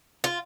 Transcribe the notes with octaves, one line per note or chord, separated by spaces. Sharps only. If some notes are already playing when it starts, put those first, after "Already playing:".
F4